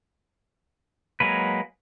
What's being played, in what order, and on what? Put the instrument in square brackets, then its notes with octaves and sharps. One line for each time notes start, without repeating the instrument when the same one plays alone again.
[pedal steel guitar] F#3 G#3 A#3 B4